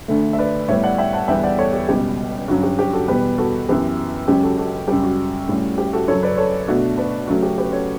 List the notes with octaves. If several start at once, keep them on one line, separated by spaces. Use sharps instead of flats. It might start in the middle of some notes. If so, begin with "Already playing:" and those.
D2 D3 A3
E5
B4 D5
A2 G3 B3 C#5 E5
D5 F#5
E5 G5
F#5 A5
E2 D3 G3 B3 D4 E5 G5
D5 F#5
A4 C#5
G4
C#2 B2 G3 G4
G2 D3 F#3 C#4 F#4
G4
G4
F#4 A4
E2 B2 G3 G4 B4
F#4 A4
F#2 E3 B3 G4
C#2 C#3 F#3 C#4 G4
F#4 A4
F#4 A4
F#2 C#3 G3 G4
F#4
A2 G3 C#4
G4
F#4 A4
F#2 C#3 F#3 A4 C#5
B4 D5
A4 C#5
B2 A3 D4 F#4 A4
B4 D5
C#3 F#3 A3 C#4 F#4
G4
G4 B4
A4 C#5